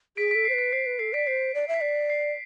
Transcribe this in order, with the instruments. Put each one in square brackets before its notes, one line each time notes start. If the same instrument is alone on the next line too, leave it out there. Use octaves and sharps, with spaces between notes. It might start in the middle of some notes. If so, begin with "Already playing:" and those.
[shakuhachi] G#4 [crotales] B6 D7
[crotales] B6 D7
[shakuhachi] A4
[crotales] C7
[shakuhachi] C5
[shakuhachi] B4 [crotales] B6 D7
[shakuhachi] C5 [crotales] C7
[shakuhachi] B4
[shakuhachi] A4 [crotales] C7
[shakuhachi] D5 [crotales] B6 D7
[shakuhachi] C5 [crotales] C7
[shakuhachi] D5
E5
[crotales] B6
[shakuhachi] D5 [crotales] C7
[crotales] C7